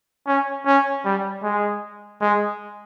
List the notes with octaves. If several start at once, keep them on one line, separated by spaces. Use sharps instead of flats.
C#4
C#4
G3
G#3
G#3